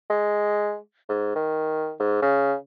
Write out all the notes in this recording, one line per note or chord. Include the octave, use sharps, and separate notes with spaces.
G#3
G#2
D#3
G#2
C#3